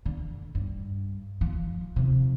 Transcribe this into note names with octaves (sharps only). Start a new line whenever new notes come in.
D3
G2
F3
F2 C3